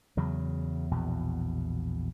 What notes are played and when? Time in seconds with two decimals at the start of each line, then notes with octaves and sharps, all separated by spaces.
0.17 E2 C#3 F#3
0.91 A#1 E2 B2